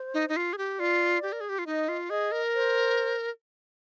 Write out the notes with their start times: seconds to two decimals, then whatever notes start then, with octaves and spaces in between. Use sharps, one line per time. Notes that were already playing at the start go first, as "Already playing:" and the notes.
Already playing: C5
0.14 D#4
0.29 D#4
0.36 F4
0.53 G#4
0.58 G4
0.79 F4 D5
1.23 G4
1.32 A#4
1.40 G#4
1.49 G4
1.59 F4
1.66 D#4 D#5
1.89 F4
2.10 G#4 D#5
2.32 A#4
2.54 C5